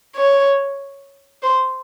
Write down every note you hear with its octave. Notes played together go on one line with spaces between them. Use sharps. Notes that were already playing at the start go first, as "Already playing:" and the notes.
C#5
C5